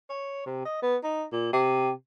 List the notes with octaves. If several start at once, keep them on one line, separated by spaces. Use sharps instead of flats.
C#5
C3
D#5
B3
D#4
A#2
C3